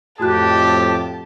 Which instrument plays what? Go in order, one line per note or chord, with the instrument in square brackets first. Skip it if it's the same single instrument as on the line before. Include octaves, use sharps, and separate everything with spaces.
[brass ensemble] F2 A2 [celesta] F#4 F#6 [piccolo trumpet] G4 [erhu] A5